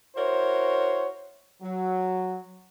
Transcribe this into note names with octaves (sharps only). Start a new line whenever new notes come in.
E4 F#4 A#4 C5 C#5
F#3